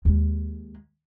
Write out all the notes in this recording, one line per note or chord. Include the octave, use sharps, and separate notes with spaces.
D#2 G#3